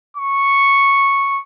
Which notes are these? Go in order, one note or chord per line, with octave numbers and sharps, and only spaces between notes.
C#6